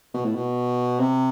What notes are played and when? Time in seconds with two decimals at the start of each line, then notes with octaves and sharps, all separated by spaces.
0.14 B2
0.25 A2
0.35 B2
1.00 C3